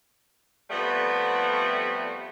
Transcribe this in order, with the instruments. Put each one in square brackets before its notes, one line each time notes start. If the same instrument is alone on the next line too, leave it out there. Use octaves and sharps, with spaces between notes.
[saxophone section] F2 G3 A3 B3